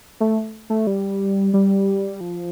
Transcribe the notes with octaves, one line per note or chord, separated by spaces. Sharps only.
A3
A3
G3
G3
F3